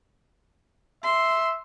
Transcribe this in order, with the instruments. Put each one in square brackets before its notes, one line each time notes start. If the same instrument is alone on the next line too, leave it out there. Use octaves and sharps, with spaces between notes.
[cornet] E5 [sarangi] C6